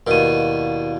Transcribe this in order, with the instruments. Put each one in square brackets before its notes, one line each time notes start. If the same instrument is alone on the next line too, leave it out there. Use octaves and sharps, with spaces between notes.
[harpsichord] D#2 B2 [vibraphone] E4 D5 F5 [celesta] A#4 D#7